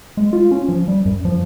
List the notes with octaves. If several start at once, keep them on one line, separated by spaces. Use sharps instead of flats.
G#3
F4
C#4
F3
G3
F#2
F3